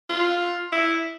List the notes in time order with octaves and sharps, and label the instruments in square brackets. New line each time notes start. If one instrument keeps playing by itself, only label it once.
[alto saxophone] F4
E4